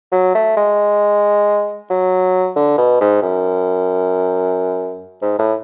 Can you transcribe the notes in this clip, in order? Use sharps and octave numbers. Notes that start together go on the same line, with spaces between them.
F#3
A3
G#3
F#3
D3
B2
G#2
F#2
G#2
A2